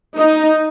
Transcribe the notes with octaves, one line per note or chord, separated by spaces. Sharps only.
D#4